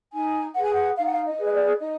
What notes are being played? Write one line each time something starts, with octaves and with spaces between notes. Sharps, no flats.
D#4 G#5
G#4 B4 F#5
G#5
F#5
D#4 F5
F#5
F5
D#5
G#4 B4
D#5
D5
D#4 D#5